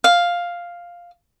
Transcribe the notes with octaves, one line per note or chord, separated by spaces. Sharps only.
F5